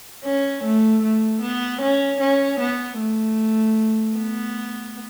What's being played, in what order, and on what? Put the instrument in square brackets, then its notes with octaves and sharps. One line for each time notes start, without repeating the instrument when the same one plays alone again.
[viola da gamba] C#4
A3
A3
B3
C#4
C#4
B3
A3
B3